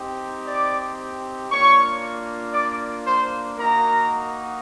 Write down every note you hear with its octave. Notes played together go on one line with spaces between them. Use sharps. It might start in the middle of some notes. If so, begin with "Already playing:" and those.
Already playing: C4 D#4 G4
D5 D6
A#3 D4 F4 C#5 C#6
D5 D6
C5 C6
A#3 D#4 F#4 A#4 A#5